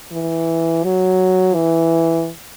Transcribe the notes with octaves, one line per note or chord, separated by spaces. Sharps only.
E3
F#3
E3